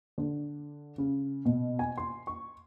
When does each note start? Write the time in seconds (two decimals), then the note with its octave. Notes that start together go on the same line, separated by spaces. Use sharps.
0.18 D3
0.98 C#3
1.45 B2
1.79 G#5
1.98 C6
2.27 C#6